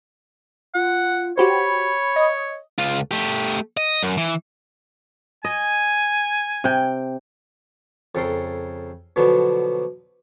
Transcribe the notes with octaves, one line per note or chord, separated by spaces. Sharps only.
F4 F#5
F#4 G4 C5 C#5 B5
D#5
C#2 F4
A3 G4
D#5
F#2
E3
D#5 G#5
C3 G5
F2 C#3 A4 A#4 C6
B2 D3 F3 F#3 B3